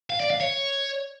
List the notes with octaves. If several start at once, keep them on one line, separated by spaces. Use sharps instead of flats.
F5
D5
F5
C#5